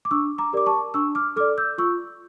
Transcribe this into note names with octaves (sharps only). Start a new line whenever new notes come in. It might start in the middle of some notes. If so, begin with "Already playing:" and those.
D6
D4 C#6 E6
A#5 D6
G4 A#4 D5 D6
A5 C#6
D4 C#6 E6
D6 F6
A4 D5 D6 F6
E6 G6
F4 C#6 E6